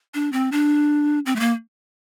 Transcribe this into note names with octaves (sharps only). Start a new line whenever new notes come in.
D4
C4
D4
C4
A3
A#3